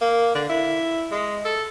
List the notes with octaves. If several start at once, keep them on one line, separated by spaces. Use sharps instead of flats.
A#3
D3
E4
G#3
A4